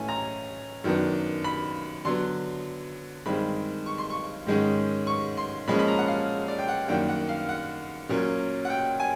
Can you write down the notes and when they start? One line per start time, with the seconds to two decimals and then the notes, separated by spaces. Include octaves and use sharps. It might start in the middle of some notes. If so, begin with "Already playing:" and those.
Already playing: A2 E3 A3 C#4 G#5
0.09 A#5
0.84 F#2 D#3 F#3 B3 D4
1.44 B5
2.05 D3 F#3 B3 C6
3.26 G2 D#3 G#3 C4 B5
3.86 C#6
3.98 C6
4.10 C#6
4.46 G#2 D#3 G#3 C#4
5.07 C#6
5.37 C6
5.68 A#2 F3 G#3 C#4 B5
5.79 B5
5.88 A#5
5.99 F#5
6.08 F5
6.48 D5
6.59 G5
6.68 F#5
6.88 F#2 D#3 G3 A#3 D4 G5
7.08 F#5
7.29 F5
7.49 F#5
8.09 A#2 F#3 A#3 C#4
8.65 F#5
8.70 G5
9.00 G#5